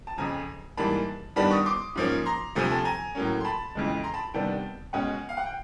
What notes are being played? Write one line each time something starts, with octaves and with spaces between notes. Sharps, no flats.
A5
F2 C#3 F3 G#5 A#5
G#2 E3 G3 A#3 A5 B5
G2 D#3 G3 B3 D4 A5 B5
C#6 D#6
C6 D6
G#2 F3 A#3 C#4
A#5 C6
D2 C3 F3 A3 G#5
A5
G#5 A#5
A2 F#3 A#3 C#4
C6
A5 B5
F2 C#3 E3 G#3
A#5 C6
A5 B5
C3 D#3 G3 B3 D4 G5 A5
B2 G#3 C#4 F#5 G#5
F5
F#5
G5